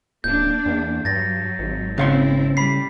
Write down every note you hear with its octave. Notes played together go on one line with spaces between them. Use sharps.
D1 A#3 D4 G6
E2
G2 F#3 A6 A#6
G#1
C#3 C4 E4 F5 C6
A2 G3 B5 B6 C7